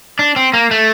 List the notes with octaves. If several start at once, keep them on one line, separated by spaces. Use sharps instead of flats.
D4
C4
A#3
A3